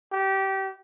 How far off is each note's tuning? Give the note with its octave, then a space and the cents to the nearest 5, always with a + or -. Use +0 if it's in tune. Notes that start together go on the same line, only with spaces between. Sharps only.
G4 -25